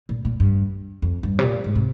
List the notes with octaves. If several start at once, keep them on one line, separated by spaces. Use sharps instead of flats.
A#2
A#2
G2
F2
G2
C3
A#2
G#2
C3